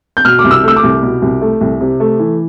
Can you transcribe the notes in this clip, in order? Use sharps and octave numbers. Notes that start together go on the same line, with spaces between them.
G6
B2 F6
D6
C2
E6
A3 E6
D6
C2
B2
C2
A3
C2
C3
A3
E3